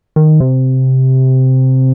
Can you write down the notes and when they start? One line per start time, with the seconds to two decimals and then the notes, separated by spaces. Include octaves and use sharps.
0.16 D#3
0.40 C3